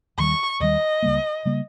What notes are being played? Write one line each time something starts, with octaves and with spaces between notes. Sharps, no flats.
D#2 D#3 G3 C#6
D#2 D#3 G3 D#5
C#2 C#3 G3 A#3
C#3 G3 A#3